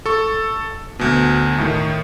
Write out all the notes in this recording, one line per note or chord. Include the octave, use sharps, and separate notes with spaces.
A4 C#6
D2 B2
A2 D#3